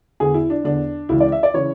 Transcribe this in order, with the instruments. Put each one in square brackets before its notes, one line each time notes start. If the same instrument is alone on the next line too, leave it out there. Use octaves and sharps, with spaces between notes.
[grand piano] E2 D3 G#4
E4
D4
E2 D3 D4
C#2 C#3 E3 E4
D5
E5
D5
C#3 E3 C#5